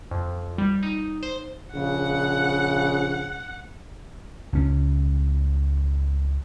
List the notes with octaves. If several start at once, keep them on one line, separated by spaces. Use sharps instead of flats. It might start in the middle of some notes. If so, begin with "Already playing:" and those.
F2
G3
D#4
C5
A#1 C#3 F#5
C#2 C#4